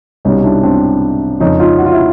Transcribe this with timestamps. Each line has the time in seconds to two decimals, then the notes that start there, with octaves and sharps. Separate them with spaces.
0.25 C2 B2 G3 C#4 D#4
0.44 D4 E4
0.63 C4 D4
1.40 F2 C#3 F3 C#4 D#4
1.59 D#4 F4
1.78 F#4
1.86 F4
1.93 E4